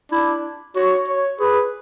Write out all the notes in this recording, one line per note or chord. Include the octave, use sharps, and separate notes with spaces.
D4 E4
F#4 C#5
C#5
G#4 B4